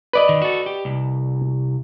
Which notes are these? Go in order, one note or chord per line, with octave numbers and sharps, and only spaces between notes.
B4 D5 D#5
D#3
F#4 A4
G4
C2